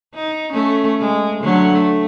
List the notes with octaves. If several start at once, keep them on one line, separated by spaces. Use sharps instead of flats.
D#4
A3 C#4
G#3
D3 F#3 A3
A3